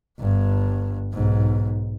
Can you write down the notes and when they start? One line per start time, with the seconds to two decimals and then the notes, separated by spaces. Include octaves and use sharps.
0.19 G1 G2
1.13 B1 G#2